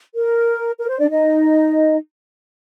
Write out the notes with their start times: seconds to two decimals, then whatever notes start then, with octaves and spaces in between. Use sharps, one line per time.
0.14 A#4
0.78 A#4
0.88 C5
0.99 D4 D5
1.10 D#4 D#5